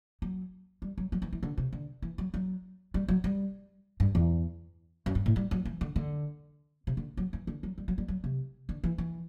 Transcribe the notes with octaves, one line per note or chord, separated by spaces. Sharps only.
F#3
G3
F#3
F#3
E3
E3
D3
C3
D3
E3
F#3
F#3
G3
F#3
G3
G2
E2
F#2
G2
A2
G3
F#3
E3
D3
D3
C3
D3
F#3
E3
D3
F#3
G3
F#3
G3
F#3
C3
D3
E3
E3